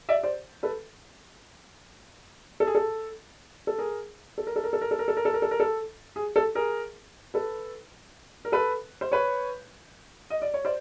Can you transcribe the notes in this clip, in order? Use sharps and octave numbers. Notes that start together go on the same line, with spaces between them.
D5 E5
C5 D5
A4 B4
A4
G#4
A4
A4
G#4 A#4
A4
A#4
A4
A#4
A4
A#4
A4
A#4
A4
A#4
A4
A#4
A4
A#4
A4
G#4
A4
G#4 A#4
A4 B4
A#4
A4 B4
C5
B4 C#5
D#5
D5
C#5
C5 D5